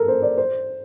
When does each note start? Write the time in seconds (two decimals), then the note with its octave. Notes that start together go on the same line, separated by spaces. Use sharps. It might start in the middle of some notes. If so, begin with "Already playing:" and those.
Already playing: A4 A#4
0.08 C5
0.22 D5
0.38 C5